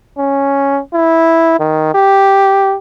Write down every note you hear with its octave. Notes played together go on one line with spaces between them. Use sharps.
C#4
E4
D#3
G4